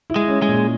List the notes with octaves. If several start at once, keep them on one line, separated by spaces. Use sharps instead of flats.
E4
G#3
C#4
G#3
A#2